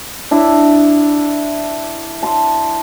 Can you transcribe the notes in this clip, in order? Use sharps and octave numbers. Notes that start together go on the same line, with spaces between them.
D4 E4
A5 C6